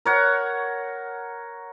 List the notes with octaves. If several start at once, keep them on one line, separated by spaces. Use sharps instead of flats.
A#4 C#5 F#5